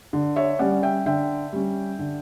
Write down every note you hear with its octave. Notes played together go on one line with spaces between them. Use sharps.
D3
C#5 E5
G3 C#4 D5 F#5
E5 G5
D3 E5 G5
G3 C#4
D3